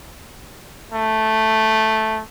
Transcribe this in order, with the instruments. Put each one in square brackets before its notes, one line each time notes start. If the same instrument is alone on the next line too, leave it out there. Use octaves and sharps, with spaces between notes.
[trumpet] A3